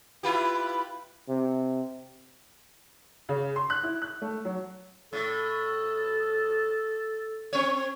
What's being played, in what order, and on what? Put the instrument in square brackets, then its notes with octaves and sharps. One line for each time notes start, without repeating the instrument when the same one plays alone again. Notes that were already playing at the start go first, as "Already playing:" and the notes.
[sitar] E4 F4 G4 [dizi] B4
[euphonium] C3
[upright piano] C#3
C6
F#6
E4
F#6
A3
F#3
[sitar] A2 [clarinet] A4
[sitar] C4 C#5